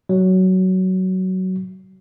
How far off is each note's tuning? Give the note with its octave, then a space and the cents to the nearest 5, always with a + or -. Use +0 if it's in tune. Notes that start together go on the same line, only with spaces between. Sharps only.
F#3 +15